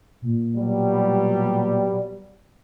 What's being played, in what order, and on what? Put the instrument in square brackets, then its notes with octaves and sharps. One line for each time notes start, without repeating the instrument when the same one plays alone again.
[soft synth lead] A#2
[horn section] B2 F#3 G3